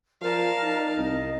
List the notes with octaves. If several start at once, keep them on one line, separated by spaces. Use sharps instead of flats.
F3 A#4 D5 F5 A5
D#4
C2 D#5